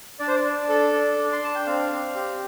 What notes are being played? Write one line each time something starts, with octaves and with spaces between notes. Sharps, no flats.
D4 D5
C5
D5
D4
A4
D4
D4
C6
D4 A5
G5
C4 F5
C4
G4